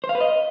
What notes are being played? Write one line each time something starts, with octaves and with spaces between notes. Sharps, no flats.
C5
F5
B4
D#5